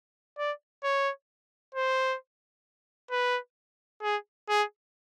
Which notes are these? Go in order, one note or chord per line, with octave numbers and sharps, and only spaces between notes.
D5
C#5
C5
B4
G#4
G#4